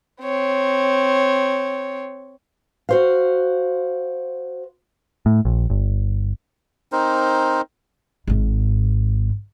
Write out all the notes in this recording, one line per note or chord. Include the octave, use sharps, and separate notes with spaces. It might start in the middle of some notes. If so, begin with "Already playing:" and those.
C4 C#5
F#4 C5 F5
A2
A#1
G1
C4 D#4 A#4 C5
G#1 G#2